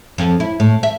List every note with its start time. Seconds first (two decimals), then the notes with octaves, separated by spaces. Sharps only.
0.18 F2
0.40 E4
0.60 A2
0.83 E5